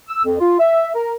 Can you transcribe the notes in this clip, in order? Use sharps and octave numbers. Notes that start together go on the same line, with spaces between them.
E6
F2
F4
E5
A#4